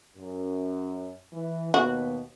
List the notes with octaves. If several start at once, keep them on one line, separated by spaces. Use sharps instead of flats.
F#2
E3
D#2 B2 B3 F#4